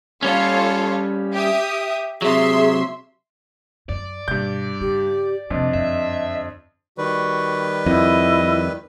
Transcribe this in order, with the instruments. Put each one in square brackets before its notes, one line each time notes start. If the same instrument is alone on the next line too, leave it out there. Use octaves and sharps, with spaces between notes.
[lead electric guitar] G3 C#4 [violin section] F4 A4 C#5
[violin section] G4 E5 D#6
[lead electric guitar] C3 F#3 [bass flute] G#4 [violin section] E5 C6
[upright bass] F#2 [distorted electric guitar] D5
[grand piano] G2 G6 [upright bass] B2
[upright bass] C#3 [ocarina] G4
[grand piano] F2 D4 [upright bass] C3 A3 [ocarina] D#5
[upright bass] F#2 D3 [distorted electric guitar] E5
[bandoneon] D#3 G3 B4 [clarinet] F#4
[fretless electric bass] F2 [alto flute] E4 [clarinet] D#5